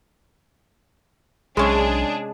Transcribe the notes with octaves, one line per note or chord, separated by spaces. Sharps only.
B1 C3 G#3 C#4 D4 E4 G#4